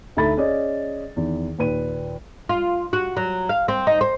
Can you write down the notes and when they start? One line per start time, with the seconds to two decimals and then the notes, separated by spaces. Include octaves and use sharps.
0.17 D2 D#4 A4 E5 B5 A6
0.37 C#4 G#4 D5 D#5
1.16 E2 D#3
1.58 D#2 A#2 B4 D#7
2.49 F4
2.93 F#4
3.17 F#3
3.49 F5
3.68 C4
3.87 D#4
4.01 C5